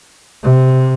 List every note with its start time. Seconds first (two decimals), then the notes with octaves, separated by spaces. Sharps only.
0.43 C3